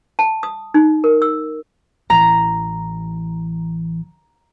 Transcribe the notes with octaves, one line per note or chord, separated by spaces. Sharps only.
A5
D#6
D#4
A#4
E6
A1 E3 A#5